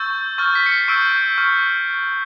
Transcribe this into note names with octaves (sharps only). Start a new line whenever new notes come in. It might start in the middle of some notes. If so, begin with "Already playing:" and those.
Already playing: C#6 E6 G6 A6
C#6 F6 A6
B6
C#7
C7
C#6 E6 G6 D7
C#6 F6